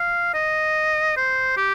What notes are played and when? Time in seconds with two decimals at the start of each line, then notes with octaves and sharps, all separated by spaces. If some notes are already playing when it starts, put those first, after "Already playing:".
Already playing: F5
0.34 D#5
1.17 C5
1.57 G4